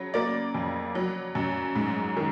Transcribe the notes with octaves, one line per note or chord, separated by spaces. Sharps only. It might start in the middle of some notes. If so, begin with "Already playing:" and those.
Already playing: C#3 F#3
A#3 D5
F2
F#3
F#2
G#2
D#3